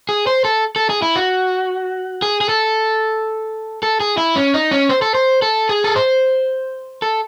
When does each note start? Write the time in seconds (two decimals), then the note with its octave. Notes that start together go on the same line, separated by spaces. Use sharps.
0.09 G#4
0.27 C5
0.45 A4
0.76 A4
0.90 G#4
1.02 E4
1.16 F#4
2.22 G#4
2.41 G#4
2.49 A4
3.83 A4
4.00 G#4
4.17 E4
4.36 C#4
4.54 D#4
4.71 C#4
4.89 C5
5.02 A4
5.15 C5
5.42 A4
5.69 G#4
5.84 A4
5.96 C5
7.02 A4